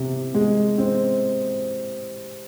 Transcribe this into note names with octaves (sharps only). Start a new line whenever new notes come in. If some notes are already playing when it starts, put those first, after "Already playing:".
Already playing: C3
G#3
C4